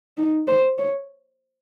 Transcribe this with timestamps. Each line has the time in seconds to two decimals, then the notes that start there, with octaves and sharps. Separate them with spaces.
0.18 D#4
0.48 C5
0.78 C#5